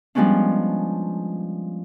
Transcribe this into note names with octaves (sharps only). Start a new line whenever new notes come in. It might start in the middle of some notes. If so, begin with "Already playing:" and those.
F3 G3 G#3 B3 C#4 D4